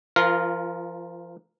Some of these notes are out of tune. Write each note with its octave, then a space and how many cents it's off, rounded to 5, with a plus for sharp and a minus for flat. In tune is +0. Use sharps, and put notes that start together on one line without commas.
F3 -30 F4 +0 A#4 +0